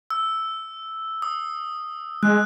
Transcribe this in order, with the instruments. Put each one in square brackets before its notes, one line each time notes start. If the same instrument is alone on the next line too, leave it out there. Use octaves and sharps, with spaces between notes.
[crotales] E6
D#6
[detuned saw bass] G#3 [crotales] F#6